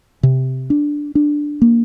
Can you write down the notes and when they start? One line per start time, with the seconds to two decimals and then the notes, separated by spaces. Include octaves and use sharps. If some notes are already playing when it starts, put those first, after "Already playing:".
0.23 C3
0.70 D4
1.15 D4
1.62 A#3